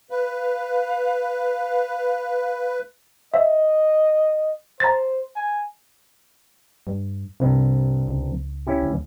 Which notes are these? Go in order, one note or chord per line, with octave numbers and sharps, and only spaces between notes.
B4 F5
D#5 E5
C5 A#5 A6
G#5
G2
C2 G2 C3
C#2
C#4 E4 G4
D2